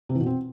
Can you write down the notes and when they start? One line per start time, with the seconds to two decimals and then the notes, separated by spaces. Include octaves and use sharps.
0.09 C3
0.15 E3
0.21 B2
0.26 C4